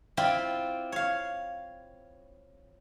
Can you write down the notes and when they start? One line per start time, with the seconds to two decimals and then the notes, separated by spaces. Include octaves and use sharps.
0.17 C4 E4 F4 D5 G5 B5
0.92 C#5 F5